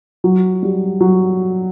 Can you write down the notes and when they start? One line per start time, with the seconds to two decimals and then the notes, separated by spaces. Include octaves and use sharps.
0.24 F#3
0.63 G3
1.00 F#3